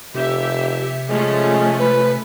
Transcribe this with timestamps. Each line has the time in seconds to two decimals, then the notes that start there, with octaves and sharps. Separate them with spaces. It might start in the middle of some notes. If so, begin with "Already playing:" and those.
0.14 F1 C3 G4 E5
1.10 F3 G#3 A3 C#4
1.79 B4